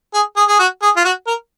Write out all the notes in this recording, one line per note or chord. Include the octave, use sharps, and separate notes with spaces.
G#4
G#4
G#4
F#4
G#4
F4
F#4
A#4